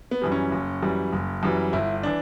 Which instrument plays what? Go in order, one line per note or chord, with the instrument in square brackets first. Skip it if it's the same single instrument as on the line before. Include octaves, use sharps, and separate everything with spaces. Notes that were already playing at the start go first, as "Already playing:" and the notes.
[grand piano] B3
F#2 E3 G3
C#4
F#1
F#2 E3 G3
F#1
F#2 E3 G3
G1 E4
E3 D4